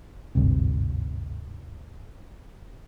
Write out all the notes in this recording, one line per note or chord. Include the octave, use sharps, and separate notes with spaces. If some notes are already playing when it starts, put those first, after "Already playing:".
G#1 D2 G2 C3